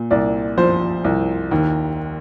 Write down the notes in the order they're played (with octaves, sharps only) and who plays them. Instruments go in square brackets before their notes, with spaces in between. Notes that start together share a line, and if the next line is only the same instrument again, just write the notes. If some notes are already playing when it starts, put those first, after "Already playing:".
Already playing: [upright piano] A#2
C2 D5
F3 C5
C2
D#2